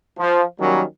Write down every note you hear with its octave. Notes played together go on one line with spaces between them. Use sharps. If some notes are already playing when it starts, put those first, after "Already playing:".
F3
D#3 F#3 G3 A#3 C#4